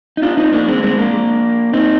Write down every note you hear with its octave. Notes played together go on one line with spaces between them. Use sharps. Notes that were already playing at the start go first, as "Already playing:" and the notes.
D#4
D4 F4
C4 D#4
A#3 D4
G#3 C4
G#3 C4
A#3 D4
C4 D#4